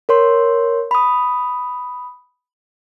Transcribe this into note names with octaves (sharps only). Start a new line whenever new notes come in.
A#4 C#5 C6
B5 D#6